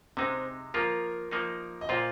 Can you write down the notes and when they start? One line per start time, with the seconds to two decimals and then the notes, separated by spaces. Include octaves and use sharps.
0.17 C3 G#3 C4 D#4
0.74 F3 A#3 F4 A#4
1.31 F3 A#3 D#4
1.81 D#5
1.89 A#2 A#3 F4 C5